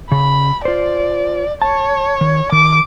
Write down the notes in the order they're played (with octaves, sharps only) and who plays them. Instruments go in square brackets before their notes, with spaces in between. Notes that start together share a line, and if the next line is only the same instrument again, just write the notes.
[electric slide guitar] C#3 [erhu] B5
[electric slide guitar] F4 C5 [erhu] D5
[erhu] C#5 [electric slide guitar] A5
[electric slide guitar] D#3
[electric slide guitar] D#3 [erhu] D6